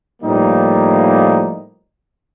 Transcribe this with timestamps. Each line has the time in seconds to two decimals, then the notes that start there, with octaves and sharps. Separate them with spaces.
0.22 A2 F3 G3 A#3 D#4